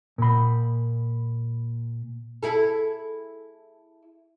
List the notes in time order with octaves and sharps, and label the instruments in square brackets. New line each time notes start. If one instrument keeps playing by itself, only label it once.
[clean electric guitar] A#2 B5
[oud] E4 G#4 A4